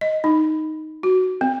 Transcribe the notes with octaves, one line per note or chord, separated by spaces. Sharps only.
D#5
D#4
F#4
C4